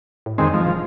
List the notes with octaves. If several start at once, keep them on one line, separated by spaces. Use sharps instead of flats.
A2
F2 D#3 G#3 C4
F3 G#3
E1